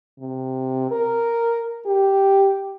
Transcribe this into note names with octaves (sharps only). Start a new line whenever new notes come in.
C3
A#4
G4